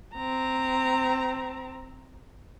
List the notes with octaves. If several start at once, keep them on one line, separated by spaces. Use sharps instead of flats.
C4 A#5